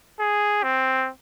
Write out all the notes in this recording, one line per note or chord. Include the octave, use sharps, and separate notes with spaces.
G#4
C4